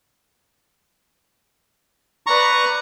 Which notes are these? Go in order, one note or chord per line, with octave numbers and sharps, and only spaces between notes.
B4 D5 A#5 C#6